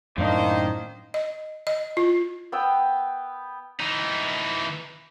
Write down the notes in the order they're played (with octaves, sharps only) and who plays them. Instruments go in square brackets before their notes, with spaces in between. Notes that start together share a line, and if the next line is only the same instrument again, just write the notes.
[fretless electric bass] F#2 A2 D4 [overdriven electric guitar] D#3 [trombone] A#3 [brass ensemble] C5 D#5
[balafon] D#5
D#5
F4
[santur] B3 G5 E6
[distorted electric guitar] E3 D#4